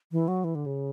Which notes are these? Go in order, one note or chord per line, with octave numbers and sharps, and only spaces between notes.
E3
F#3
E3
D3
C#3